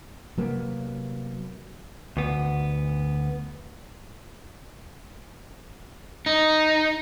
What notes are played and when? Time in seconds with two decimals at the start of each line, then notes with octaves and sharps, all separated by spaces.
0.38 C3 F#3 A#3 B3
2.17 D2 B3
6.26 D#4